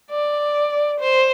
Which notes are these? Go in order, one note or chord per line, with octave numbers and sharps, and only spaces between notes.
D5
C5